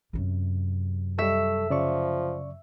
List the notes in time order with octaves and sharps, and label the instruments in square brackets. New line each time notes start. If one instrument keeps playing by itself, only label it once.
[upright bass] F#2 C3
[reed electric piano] G3 C#6 [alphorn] A4 [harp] E5
[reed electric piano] C#3 D5 C#6 [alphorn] F3